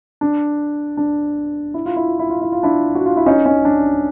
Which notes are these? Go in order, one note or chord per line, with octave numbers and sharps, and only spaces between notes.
D4
D4
E4
F4
E4
F4
E4
F4
E4
F4
D4 E4
F#4
F4
E4
C#4 D#4
C#4 D#4
D4